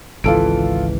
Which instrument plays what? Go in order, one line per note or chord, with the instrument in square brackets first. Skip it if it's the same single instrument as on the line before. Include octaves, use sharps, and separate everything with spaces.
[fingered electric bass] G#1 C#2 E3 [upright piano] F4 A4 D7